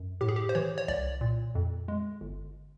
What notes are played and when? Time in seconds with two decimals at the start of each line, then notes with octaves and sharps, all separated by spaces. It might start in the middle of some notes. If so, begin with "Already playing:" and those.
Already playing: F#2
0.21 A2 G4
0.29 G#4
0.36 G4
0.49 C5
0.55 E3 C#5
0.78 C#5
0.88 C2 D5
1.21 A#2
1.55 F2
1.88 G#3
2.21 G1